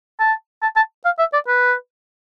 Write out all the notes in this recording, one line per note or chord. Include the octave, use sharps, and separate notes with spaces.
A5
A5
A5
F5
E5
D5
B4